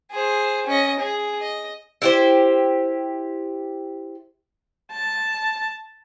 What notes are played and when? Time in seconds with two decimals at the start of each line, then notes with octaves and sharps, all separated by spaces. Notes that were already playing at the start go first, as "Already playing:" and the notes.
0.11 G#4 C5
0.67 C#4 D#5
1.00 G#4
1.41 D#5
2.02 E4 G4 C5
4.91 A5